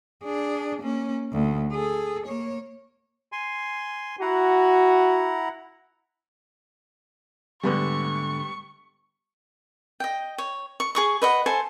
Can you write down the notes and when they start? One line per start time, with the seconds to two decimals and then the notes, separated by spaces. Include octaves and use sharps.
0.24 D4 G#4
0.81 A#3 C#4
1.33 D2
1.72 G#4 A4
2.26 A#3 C#5
3.32 G#5 C6
4.21 E4 F#4 F#5 A#5
7.63 D2 G#2 D3 G3 B3 C#6
10.00 D#5 G5
10.38 C#5
10.80 C#6
10.95 G#4 C#6 D#6
11.22 B4 D#5 F#5
11.46 A4 C5 G#5